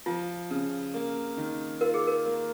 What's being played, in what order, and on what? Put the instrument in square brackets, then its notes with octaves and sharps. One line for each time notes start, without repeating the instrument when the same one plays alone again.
[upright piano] F3 [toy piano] F4
[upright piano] C#3
A#3
D#3
[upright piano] F4 [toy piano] A#4
[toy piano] G#4
A#4
[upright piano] A#3